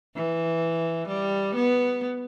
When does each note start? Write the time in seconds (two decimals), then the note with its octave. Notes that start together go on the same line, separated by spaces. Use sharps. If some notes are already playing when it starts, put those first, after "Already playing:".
0.15 E3
1.08 G3
1.55 B3